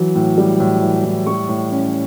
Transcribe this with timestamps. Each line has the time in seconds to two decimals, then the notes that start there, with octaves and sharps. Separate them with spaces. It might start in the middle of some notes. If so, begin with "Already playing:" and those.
Already playing: E3 F#3
0.15 A2
0.38 G3
0.60 A2
0.82 E3
1.04 A2
1.27 G3 C#6
1.49 A2
1.71 C#4